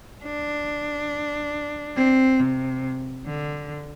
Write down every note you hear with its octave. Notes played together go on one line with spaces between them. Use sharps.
D4
C4
C3
D3